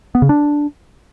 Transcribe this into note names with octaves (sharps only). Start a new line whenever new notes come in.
B3
C#3
D4